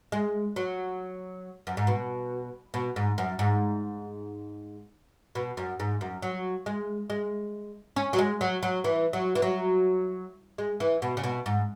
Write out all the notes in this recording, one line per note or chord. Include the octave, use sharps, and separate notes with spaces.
G#3
F#3
F#2
G#2
B2
B2
G#2
F#2
G#2
B2
F#2
G#2
F#2
F#3
G#3
G#3
C#4
F#3
G#3
F#3
F#3
E3
F#3
E3
F#3
G#3
E3
B2
C#3
B2
G#2